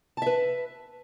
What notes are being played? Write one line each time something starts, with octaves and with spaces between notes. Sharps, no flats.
B4 E5 A5